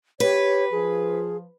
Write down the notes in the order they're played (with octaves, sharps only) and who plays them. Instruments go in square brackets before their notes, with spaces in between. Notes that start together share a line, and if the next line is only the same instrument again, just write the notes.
[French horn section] G4 [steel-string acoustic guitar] B4 [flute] C#5
[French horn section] F3 [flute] G#4